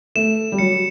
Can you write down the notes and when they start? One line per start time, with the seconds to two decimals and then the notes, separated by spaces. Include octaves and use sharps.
0.15 A3 E7
0.52 G3
0.59 F#3 C#7